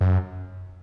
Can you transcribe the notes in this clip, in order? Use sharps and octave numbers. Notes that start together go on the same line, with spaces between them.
F#2